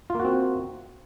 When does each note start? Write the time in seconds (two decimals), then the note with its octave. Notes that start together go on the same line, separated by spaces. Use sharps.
0.10 F4
0.15 A#3
0.20 F#4
0.25 C4